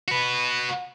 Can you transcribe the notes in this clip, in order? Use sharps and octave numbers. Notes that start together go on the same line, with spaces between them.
F#4 B4